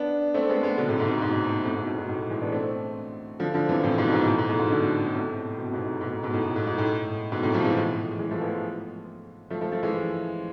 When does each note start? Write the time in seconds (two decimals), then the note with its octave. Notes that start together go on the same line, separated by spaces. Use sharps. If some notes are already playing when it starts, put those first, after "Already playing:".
Already playing: B3 D4
0.34 A3 C4
0.49 G#3 B3
0.63 G#3 B3
0.77 B2 D3
0.88 A2 C3
1.00 G#2 B2
1.11 A2
1.22 G#2 B2
1.65 A2 C3
1.76 G#2 B2
1.87 A2
1.98 G#2 B2
2.09 A2
2.30 E3 G#3
2.41 B3 D4
2.52 A3 C4
3.39 D3 F3
3.54 D3 F3
3.69 C3 E3
3.83 A2 C3
3.98 G#2 B2
4.12 G#2 B2
4.27 A2
4.38 G#2
4.49 A2
4.59 G#2 B2
4.71 B2 D3
5.08 B2
5.14 A2 C3
5.58 B2
5.66 C3
5.73 G#2 B2
6.01 G#2 B2
6.12 A2
6.23 G#2 B2
6.34 A2
6.45 A2
6.56 G#2 B2
6.67 G#2
6.78 A2
7.32 G#2 B2
7.43 A2 C3
7.54 F3 A3
7.64 E3 G#3
8.19 E3 G#3
8.31 F3 A3
8.41 G#3 B3
9.50 F3 A3
9.61 F3 A3
9.72 F3 A3
9.83 E3 G#3